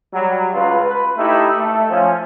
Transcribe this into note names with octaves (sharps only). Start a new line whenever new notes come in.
F#3 G3
C#2 F4 B4
B4
A3 D#4 E4 G4
A3
F3 C#4